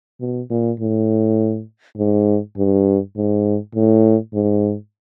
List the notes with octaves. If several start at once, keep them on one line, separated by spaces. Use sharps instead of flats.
B2
A#2
A2
G#2
G2
G#2
A2
G#2